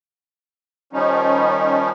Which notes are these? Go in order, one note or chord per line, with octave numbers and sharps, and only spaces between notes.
D#3 F3 G3 C#4 D#4